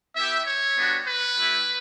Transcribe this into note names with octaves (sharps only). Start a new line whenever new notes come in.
B3 E4 G4 E5
C#5
G3 B3 D4 F#4
B4
A3 E4 G4